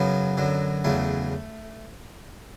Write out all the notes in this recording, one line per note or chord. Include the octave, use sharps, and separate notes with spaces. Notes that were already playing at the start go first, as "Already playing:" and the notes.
Already playing: F#2 C#3 F#3 B3
F#2 D3 F#3
E2 C#3 F#3 A3